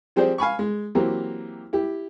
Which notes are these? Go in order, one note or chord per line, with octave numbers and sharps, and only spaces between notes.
F3 C4 G4 G#4 C5 D5
F5 G#5 B5 C#6
G#3
E3 F#3 A#3 C4 G4
E4 G4